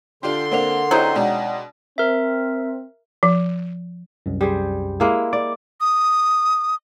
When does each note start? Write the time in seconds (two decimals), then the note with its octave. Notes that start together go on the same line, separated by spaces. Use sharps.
0.23 D3 D4 F4 G4 C6
0.51 A#3 C4 D4 A#4 F#5 F7
0.91 F#3 C4 D#4 E4 G#4 D5
1.15 B2 G#3 D4 D5 F#5
1.98 C4 A#4 E5
3.23 F3
4.26 C2 F#2
4.41 G3 G#4 C5
5.00 G#3 A#3 E4
5.33 D5 D6
5.81 D#6